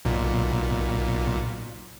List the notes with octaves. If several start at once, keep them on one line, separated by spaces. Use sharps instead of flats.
B1 A#2